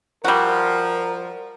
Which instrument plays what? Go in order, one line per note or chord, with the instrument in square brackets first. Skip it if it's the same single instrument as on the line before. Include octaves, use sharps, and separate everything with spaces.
[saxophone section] F3 [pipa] G3 F#4 [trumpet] A#4